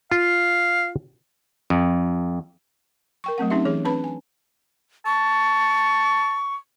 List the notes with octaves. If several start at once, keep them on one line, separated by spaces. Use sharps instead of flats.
F4 F5
F2
A#4 G5 C#6
F#3 A3 C4 F#5
C4 C#4 D#4 G4 E5
E3 G#4 C#5
C4 D4 B4 A5 B5
G#5
A5 C#6